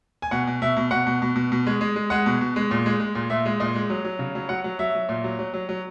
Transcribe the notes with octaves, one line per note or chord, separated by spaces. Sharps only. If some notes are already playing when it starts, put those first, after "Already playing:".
G#5
B2 F#5
B2
B2 E5
B2
B2 F#5
B2
B2
B2
B2
G#3
G#3
G#3
G#3 F#5
B2
B2
G#3
A#2
G#3
G#3
A#2
A#2 E5
G#3
A#2 D#5
G#3
F#3
F#3
C#3
F#3
F#3 F#5
F#3
F#3 E5
F#3
A#2
F#3
F#3
F#3
F#3